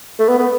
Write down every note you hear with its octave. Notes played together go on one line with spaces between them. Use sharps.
A3
B3
B3